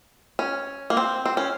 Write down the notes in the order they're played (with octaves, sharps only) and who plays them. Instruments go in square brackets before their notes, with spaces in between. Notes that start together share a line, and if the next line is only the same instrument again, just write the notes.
[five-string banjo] C#4
A#3
C4
C4
C#4